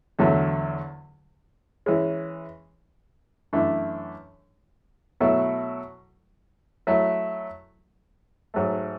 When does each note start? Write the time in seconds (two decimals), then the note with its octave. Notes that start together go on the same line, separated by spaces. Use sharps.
0.19 E2 D3 F#3 A3
1.86 E3 G#3 C#4
3.53 F#2 E3 A3 D4
5.20 B2 F#3 A3 E4 A4
6.87 F#3 A3 E4
8.54 G#2 F#3 A3